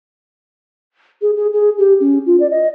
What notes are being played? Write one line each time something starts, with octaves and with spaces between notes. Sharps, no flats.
G#4
G#4
G#4
G4
C#4
F4
D5
D#5